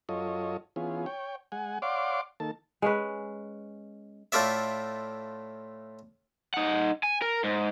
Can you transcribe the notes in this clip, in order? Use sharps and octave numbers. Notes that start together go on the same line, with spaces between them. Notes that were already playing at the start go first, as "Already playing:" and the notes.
F#2 F4 A4 C#5 D#5
E3 B3 C#4 F4 G#4
C#5 G5
G#3 F#5 G#5
C#5 D5 F5 F#5 C6 D6
D#3 A#3 A4 A5
G#3 C#4 B4
A2 A3 F4 D5 E5
D#4 F#5
G#5
A#4
G#2